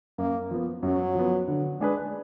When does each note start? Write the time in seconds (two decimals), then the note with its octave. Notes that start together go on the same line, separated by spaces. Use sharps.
0.18 F#2 A#3
0.51 F3 B3
0.83 F#2 F#3
1.15 F3 B3
1.48 D3
1.80 G#3 D4 G#4 B4